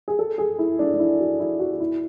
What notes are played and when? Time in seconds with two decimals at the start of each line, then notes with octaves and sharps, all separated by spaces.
0.08 G#4
0.19 A4
0.38 G#4
0.58 E4
0.79 D4
0.93 D4
0.99 E4
1.20 F#4
1.40 E4
1.59 F#4
1.72 F#4
1.80 E4